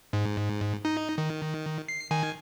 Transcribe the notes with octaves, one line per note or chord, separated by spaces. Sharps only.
G#2
D#4
D#3
C7
D#3 G#5